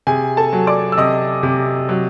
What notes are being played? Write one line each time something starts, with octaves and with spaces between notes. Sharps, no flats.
C3 G#4 G#5
A4 A5
F#3
D5 D6
E6
C3 D#5 D#6
C3
F#3